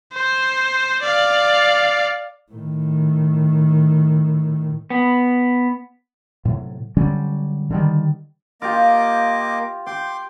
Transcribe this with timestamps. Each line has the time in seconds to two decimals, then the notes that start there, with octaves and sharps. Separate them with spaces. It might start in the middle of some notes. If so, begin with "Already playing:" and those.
0.14 C5
1.02 D5 F5
2.52 A2 D#3
4.90 B3
6.45 A2 C3 F#3
6.97 D3 F#3 G3 C#4
7.70 D3 D#3 G3
8.62 A#3 F4 G4 D#5 D6
9.87 G5 C6 D6